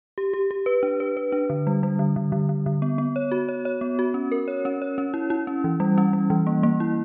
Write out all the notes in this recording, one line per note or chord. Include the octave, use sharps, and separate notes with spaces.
G4
G4
G4
B4
D4
B4
B4
D4
D3
G3
G3
D3
D3
D3
D3
D3
B3
B3
C#5
F#4
C#5
C#5
B3
F#4
C#4
A#4
C#5
C#4
C#5
C#4
E4
E4
C#4
E3
G3
C#4
G3
E3
A#3
A#3
E4